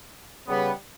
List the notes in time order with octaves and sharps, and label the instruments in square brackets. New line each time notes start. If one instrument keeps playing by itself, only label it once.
[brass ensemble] C#3 G3 B3